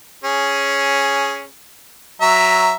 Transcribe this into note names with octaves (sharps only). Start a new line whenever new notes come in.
C#4 G#4
F#3 E5 A#5